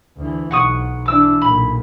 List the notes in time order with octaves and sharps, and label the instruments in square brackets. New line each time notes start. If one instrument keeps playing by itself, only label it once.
[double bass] D2 E3
[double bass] B1 [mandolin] F#5 C#6 D#6
[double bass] E3 D4 [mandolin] D6 E6
[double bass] B1 A#2 [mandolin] B5